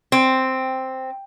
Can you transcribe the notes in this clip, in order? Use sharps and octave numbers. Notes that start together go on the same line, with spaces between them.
C4